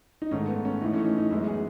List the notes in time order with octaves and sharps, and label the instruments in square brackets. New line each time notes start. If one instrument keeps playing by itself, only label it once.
[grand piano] D#4
G#2 D#3 A3 C#4
B3
C#4
A2 E3 A3 D#4
C#4
D#4
C#4
D#4
F#2 E3 G#3 B3 E4
G#4